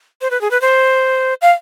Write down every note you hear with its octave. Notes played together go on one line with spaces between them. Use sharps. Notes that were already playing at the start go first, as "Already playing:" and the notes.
C5
B4
G#4
B4
C5
F5